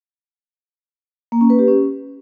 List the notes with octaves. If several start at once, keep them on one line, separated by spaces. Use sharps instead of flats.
A#3
C#4
B4
G4
C#4